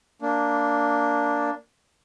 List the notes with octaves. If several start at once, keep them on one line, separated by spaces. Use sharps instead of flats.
A#3 D4